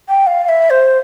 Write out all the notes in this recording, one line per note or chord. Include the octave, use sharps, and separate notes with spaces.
G5
F5
F5
E5
C5